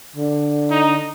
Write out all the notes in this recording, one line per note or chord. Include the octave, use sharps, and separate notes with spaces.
D3
D#4 A#5